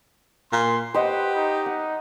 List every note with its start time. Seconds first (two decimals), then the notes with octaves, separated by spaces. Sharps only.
0.52 A#2 C6
0.94 G4 B4 C5 D#5 F#5
1.36 D#4
1.66 F#5